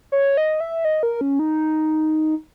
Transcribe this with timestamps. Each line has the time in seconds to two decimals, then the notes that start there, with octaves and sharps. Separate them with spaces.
0.12 C#5
0.37 D#5
0.60 E5
0.85 D#5
1.03 A#4
1.21 C#4
1.39 D#4